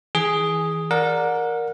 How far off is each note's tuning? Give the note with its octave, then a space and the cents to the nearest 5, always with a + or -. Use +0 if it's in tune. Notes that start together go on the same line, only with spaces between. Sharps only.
E3 -30 G#4 +0
A#4 +0 D5 +0 F#5 -30